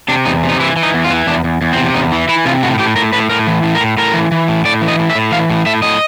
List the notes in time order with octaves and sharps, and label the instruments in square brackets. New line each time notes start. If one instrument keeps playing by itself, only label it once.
[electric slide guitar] C3 D4
E2 D#4
C3
D#4
E3 E4
E3
D#4
E2
F4
E3
E2 D4
E2
E2
C4
C3
E2 D#4
E3
E3 E4
C3 F4
A2 F#4
A2 G4
A2 A#4
A2 B4
A2 A#4
E3
A2
A#4
A2
A2 A#4
E3
E3
A2
A2 D5
E3
D#5
A2
E5
A2
E3 F5
A2
A2 E5
A2 D#5